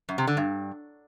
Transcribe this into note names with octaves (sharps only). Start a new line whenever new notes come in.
F#2
C3
D3
G2